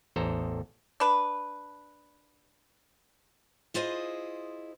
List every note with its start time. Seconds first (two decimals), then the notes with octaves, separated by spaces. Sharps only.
0.16 A1 E2 A4 C5 A#5
1.00 D4 B4
3.74 E4 F4 G#4 C5 D#5